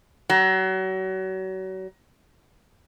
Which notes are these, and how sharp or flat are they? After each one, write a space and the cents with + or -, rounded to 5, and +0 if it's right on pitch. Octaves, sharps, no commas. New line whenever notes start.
F#3 +35